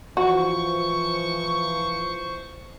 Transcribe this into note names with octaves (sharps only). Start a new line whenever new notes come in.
E3 F3 F#4 C5 C#6